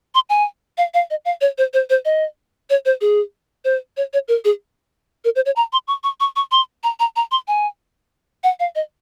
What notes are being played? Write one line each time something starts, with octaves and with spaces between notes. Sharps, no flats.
C6
G#5
F5
F5
D#5
F5
C#5
C5
C5
C5
D#5
C#5
C5
G#4
C5
C#5
C#5
A#4
G#4
A#4
C5
C#5
A#5
C6
C#6
C#6
C#6
C#6
C6
A#5
A#5
A#5
C6
G#5
F#5
F5
D#5